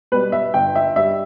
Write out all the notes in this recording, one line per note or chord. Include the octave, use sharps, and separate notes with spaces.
B2 G3 B4
E5
G1 G5
E5
G2 G3 E5